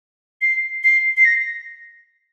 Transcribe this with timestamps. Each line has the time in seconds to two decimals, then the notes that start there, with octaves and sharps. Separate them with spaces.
0.41 C7
0.83 C7
1.17 C7
1.25 A#6